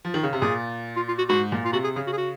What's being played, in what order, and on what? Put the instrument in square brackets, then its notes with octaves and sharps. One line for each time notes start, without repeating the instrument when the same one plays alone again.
[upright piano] F3
D#3
C#3
C3
[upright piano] A#2 [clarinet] G#4
[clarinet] F4
F4
F#4
[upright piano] G#2 [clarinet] F#4
[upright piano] A#2
[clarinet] F4
[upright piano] C3 [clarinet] F#4
[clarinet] G#4
[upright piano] C#3 [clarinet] G#4
[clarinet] F#4
G#4
F#4